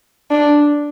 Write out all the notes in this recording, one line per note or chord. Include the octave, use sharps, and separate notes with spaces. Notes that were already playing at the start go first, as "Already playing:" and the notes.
D4